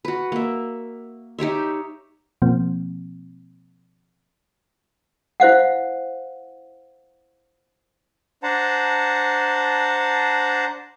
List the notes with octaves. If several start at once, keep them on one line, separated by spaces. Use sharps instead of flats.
F#4 B4
A#3 E5
D#4 G4 C#5 E5
B2 F3 A#3 C4
E4 C5 F5 F#5
D4 C5 F#5 A5 A#5